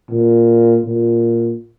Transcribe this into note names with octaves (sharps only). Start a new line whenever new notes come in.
A#2
A#2